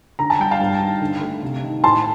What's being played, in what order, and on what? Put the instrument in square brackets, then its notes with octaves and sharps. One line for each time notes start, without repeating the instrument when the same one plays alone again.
[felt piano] D3 [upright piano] A#5
[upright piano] A5
[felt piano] G3 [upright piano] G5
[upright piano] F5 A5
[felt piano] G2
D#3
D3
A3
C3
D#3
[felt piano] A2 [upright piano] A5 C6